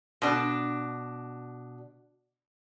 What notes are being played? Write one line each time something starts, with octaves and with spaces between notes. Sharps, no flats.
B2 D4